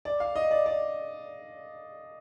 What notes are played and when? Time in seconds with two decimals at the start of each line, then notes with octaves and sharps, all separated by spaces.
0.05 D5
0.20 F5
0.36 D#5
0.51 D5
0.66 D5